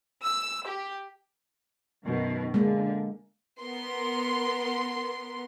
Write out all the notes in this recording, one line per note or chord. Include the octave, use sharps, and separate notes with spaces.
E6
G4
F#2 B2 D#3
D3 G#3 A#3
B3 A#4 C6